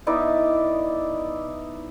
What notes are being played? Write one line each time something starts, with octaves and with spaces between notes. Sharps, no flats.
B3 D#4 E4 D5